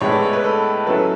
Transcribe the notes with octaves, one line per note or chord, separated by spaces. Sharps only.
A2 G#3 B3 E4 C#5
D5
C#5
B4
A4
F#3 C#4 E4 A4 B4